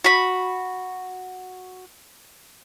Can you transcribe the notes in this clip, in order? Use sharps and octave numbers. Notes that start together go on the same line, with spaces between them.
F#4 B5